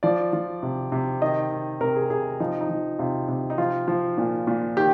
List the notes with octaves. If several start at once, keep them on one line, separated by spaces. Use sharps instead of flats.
F3 D5
F3
C3
C3
D#3 D#5
D#3
C3 A#4
G#4
C3 G#4
F3 D#4
D#4
F3
C3 F4
C3
D#4
F3 F4
F3
A#2
A#2
D#3 G4